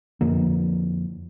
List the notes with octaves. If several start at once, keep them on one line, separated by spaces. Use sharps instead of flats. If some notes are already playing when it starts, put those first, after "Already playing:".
F2 D3 F3 A#3